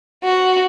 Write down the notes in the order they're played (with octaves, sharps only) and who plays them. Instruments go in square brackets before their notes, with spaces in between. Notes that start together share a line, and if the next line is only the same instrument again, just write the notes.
[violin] F#4